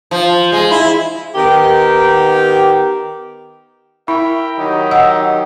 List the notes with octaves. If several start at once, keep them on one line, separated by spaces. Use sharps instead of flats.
F3
G#3
E4
D#3 B3 G4
E4 A#4 E5 G5 B5
D#3 F#3 D#4 G4
D#5 F#5 E6